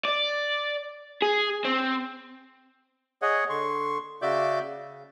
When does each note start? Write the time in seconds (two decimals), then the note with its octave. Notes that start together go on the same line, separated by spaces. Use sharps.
0.05 D5
1.22 G#4
1.65 C4
3.22 G#4 C#5 D#5 F#5
3.50 D3 C6 C#6
4.22 C#3 F#4 D5 E5 D6 G6
4.66 C#3